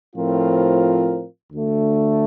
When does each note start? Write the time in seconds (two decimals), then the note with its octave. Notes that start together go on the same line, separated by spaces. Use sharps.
0.15 A2 F3 C4 F4 A#4
1.52 D2 D3 A3